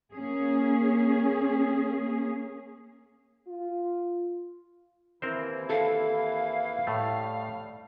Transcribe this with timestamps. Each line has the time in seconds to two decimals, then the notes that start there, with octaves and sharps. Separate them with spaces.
0.12 A#3 C#4 G#4
3.48 F4
5.22 D#2 E3 C4 E4 A#4 C5
5.70 A4 F5
6.87 A2 G3 A3 F6